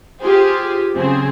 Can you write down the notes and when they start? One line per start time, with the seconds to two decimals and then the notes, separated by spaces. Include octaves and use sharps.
0.21 F4 G4 G#4 C5
0.96 C#3 F#3 C4 G#4